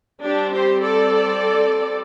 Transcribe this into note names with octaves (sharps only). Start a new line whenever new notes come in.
G3 C4 D4 G4
G4 C5
A4 D5